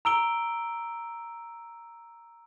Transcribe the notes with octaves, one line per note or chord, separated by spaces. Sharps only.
A#5 E6 D7 G7